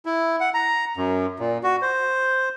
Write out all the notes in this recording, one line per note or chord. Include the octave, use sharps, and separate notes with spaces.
E4
F#5
A#5
F#2
A#2
F#4
C5